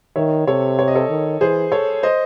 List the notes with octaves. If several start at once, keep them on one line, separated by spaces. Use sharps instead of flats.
D#3 C#5 E5
C3 A4 C#5
C#5
D#5
A4 C#5
D#3
E3 G#4 C5
A4 C#5
C5 D#5